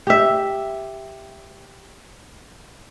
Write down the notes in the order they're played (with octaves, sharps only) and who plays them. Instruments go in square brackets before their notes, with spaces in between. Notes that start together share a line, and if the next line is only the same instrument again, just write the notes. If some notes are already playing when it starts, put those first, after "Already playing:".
[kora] G4 E5